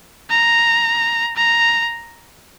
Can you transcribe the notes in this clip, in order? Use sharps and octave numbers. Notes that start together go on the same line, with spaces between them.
A#5
A#5